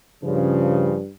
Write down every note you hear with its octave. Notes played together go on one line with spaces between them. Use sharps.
G2 C#3 F3